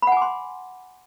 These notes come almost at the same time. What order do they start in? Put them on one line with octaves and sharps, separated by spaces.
B5 F#5 G#5 D6 C6